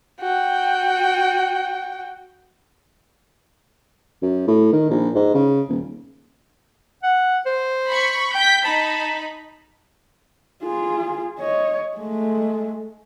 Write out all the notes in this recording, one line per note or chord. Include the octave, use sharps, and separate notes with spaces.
F#4 G5
F#2
A2
D#3
A#1
G#2
C#3
D#1
F#5
C5
B5 C#6
G5 G6 B6
D#4 A5 B5
F4 G#4
C#5 D#5
G#3 A3